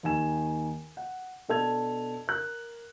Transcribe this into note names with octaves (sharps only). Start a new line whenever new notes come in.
D#2 D#3 G#5 E7
F#5
B2 D4 A4 A5 G#6 F7
A#4 F#6